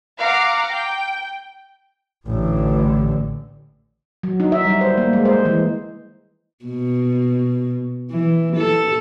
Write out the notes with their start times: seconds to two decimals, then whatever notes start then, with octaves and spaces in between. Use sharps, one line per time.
0.18 F5 F#5 A#5 D6
0.69 G5
2.26 A1 D3
4.23 F#3
4.40 D#4
4.52 E5
4.65 G3
4.81 C5
4.98 A#3
5.13 G#3
5.25 C5
5.45 E3
6.65 B2
8.11 E3
8.55 A4